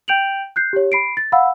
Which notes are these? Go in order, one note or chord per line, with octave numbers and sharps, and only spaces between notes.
G5 G6 D7 F7 F#7
F#6 G6 C7
G4 C#5
B5 C7 D7
A6
F5 F#5 B5 E6